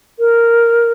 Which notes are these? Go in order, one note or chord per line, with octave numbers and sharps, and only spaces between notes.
A#4